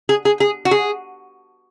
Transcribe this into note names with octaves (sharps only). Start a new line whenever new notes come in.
G#4
G#4
G#4
F#4
G#4